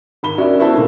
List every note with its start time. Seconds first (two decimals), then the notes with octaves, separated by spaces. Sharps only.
0.23 G#1 B5 G7
0.38 C#4 D4 F#4 A#4 D5 E5
0.59 B3 E4 F#4 C5 E5 A5
0.73 A#2 D3 D#3 A3 A#3